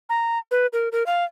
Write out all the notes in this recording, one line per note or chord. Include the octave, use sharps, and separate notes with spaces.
A#5
B4
A#4
A#4
F5